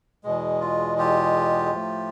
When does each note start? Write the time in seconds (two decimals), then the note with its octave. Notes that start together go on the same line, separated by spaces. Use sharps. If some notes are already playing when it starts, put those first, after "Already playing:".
0.24 E2 B2 G#3
0.60 F4
0.98 F4 G4
1.72 A2 F3 A3